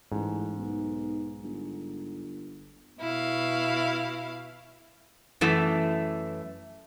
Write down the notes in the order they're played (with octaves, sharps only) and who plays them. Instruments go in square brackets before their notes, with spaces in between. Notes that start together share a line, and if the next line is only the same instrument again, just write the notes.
[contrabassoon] A1 [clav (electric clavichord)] G#2
[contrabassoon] B1
G1
[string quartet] B2 E4 F5
[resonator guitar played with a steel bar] F#2 E3 A3